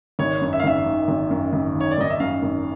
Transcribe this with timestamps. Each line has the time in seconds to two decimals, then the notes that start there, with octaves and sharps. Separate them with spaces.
0.19 G#1 C#5
0.42 F#2
0.53 E5
0.60 F5
0.64 G#1 E5
0.86 D#3
1.08 G#1
1.31 F#2
1.53 G#1
1.75 D#3
1.81 C#5
1.91 D5
1.98 G#1 D#5
2.10 E5
2.20 F#2 F5
2.43 G#1